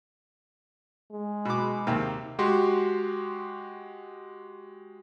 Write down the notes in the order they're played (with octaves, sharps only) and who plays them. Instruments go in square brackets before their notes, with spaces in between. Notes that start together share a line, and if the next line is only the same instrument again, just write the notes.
[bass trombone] G#3
[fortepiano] B2 D6
D#2 C3 A#3
[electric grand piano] G#3 F#4 G4 C6